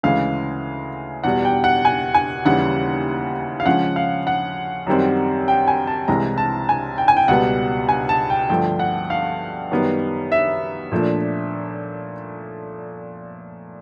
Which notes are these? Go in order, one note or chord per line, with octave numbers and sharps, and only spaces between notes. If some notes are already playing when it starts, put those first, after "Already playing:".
D2 C#3 E3 G#3 F5
E2 B2 G3 F#5
G5
F#5
G#5
G#5
D#2 C#3 E3 G3 F#5
F5
C#3 F3 G#3 C#4 F#5
F5
F#5
F#2 D#3 G3 C4
G5
G#5
A5
C2 C3 E3 G#3 C4 A#5
A5
G#5
G5
G#5
G5
C#2 B2 G3 B3 F#5
G#5
A5
G5
G2 D3 F3 A3 G5
F#5
F5
F#2 D#3 G3 B3
E5
A#2 F3 A3 D4